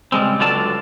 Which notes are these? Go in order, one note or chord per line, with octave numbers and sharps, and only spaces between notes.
C#3 G3 G#3 C4
C#2 D3 F#3 F4 D5 A5